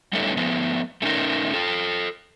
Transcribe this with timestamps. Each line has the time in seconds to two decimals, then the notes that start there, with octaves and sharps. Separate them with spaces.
0.13 G3 A3 B3 C#4 D#4 A4
0.37 F3 A3 B3
1.02 A3 C#4 D#4 G4 A#4
1.54 F4 A4